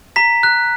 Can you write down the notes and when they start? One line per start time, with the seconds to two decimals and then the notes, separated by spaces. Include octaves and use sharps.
0.16 A#5 B6
0.43 F#6